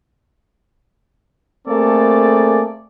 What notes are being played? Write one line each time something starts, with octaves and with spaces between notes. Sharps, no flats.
A3 A#3 C4 G#4 A4 D5